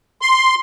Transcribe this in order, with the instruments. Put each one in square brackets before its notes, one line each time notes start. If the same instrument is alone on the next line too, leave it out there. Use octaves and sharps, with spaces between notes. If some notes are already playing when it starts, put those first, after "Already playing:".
[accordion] C6